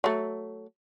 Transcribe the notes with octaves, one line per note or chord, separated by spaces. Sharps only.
F#3 A3